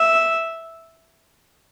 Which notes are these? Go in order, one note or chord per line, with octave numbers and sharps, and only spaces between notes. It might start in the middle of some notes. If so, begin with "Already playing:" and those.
Already playing: E5